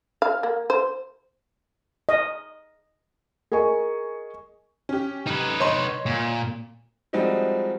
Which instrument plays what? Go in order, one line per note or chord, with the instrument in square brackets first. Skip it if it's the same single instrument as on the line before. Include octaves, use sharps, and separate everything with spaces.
[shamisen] F5
A#3
C5
[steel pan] D#5
[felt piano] G#4 A#4 D#5 G#5 C#6
[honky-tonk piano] C#4 G4
[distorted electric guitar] D#4 B4
[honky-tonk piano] C#5 D#5 C6
[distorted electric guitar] A#2
[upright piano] F3 G3 G#3 C4 D#4 F#4